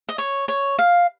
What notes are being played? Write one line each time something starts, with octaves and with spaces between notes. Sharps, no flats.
D#5
C#5
C#5
F5